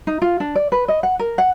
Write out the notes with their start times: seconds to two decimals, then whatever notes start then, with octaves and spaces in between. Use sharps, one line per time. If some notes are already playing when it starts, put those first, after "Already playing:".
0.07 D#4
0.22 F4
0.40 D4
0.55 D5
0.72 B4
0.88 D#5
1.03 F#5
1.19 A#4
1.38 F#5